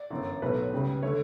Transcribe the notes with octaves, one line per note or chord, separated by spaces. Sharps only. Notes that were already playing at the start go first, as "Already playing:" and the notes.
Already playing: D5
G1 F#2 E3
B1 A2 F#3 A3 B4
C#2 C#3 G3
D3 A3 C#5